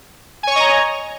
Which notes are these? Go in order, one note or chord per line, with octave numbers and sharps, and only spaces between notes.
C#5 D#5 G#5 A#5 C#6